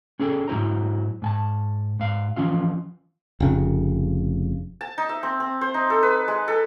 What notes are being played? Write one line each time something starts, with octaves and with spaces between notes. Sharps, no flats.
C#4 G#4 A4 G5
G#2 F#3 E4 C5 A#5
G#2 G#5 A5
G#2 F5
E3 F3 C#4 F4 F5
F1 C#3
A5
D#4
E5
C4
C4
C5
D#4
A4
B4
G#3
A4